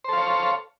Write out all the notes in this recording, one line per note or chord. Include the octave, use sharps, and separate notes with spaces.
A4 C5 C#5 F5